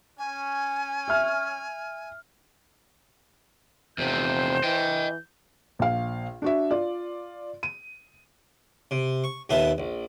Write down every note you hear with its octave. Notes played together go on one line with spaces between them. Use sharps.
C#4 G#5
E5 F6
F1 E2 C3 C5 G6
E3 D#5 G5
A#1 F5
D4 F#4 E5
F4 D5
D#7
C3
C#6
D#2 A#2 B3 A4 E5 D#6
A#1